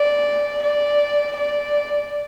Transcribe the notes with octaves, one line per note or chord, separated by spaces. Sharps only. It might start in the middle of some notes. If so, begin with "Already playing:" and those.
Already playing: D5
D5
D5